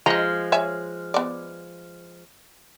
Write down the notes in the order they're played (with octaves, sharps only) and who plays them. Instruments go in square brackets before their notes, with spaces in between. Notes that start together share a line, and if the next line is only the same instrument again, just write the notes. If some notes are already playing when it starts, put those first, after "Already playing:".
[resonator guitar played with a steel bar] F3 G#3 [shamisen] D#5 A#5
[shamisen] C#5 E5 G#5
B3 D5